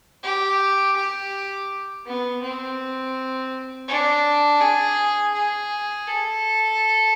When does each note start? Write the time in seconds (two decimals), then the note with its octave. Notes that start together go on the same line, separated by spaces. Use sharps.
0.23 G4
0.96 G4
2.06 B3
2.42 C4
3.88 D4
4.61 G#4
5.34 G#4
6.07 A4